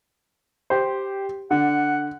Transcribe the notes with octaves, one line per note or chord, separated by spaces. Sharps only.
G4 C5
D3 F#5